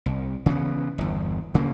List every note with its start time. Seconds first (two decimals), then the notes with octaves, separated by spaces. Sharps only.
0.06 C2
0.46 C#3 E3 G3 B3
0.98 G1 E2
1.54 D2 C#3 A#3